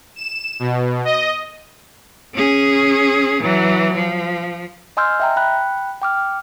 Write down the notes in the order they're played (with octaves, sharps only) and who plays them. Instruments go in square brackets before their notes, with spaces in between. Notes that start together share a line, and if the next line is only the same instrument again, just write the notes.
[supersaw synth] E7
B2
D#5
[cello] C#4 G#4
E3 F#3
F3
[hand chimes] D#5 G#5 C6 E6 F6 G6
E5 G5 A#5
G5 B5 F#6
G5 D6 F6